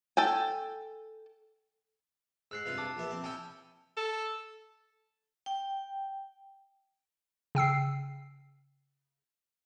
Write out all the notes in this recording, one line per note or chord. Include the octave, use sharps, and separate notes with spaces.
A4 G5 G#5
G#2 E6 F#6 C7
G2 C3 F4
A5 D6
A#1 B3 E5
C4
C#4 E4 G5 A5 E6
A4
G5
C#3 G5 E6 C7